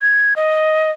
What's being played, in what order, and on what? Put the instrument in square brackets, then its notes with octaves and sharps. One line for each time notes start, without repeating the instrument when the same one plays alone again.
[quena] G#6
D#5